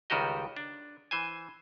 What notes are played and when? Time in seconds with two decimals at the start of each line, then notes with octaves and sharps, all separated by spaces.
0.10 C#2 D#3 G3 F#4 G4 D#5
0.56 D4
1.11 E3 C5 G#5